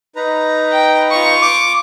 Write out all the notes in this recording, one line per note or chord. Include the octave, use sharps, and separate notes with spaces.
D#4 B4 A#5
G5
F4 C#6
D6